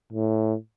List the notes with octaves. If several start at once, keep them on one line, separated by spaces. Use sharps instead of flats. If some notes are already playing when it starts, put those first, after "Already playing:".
A2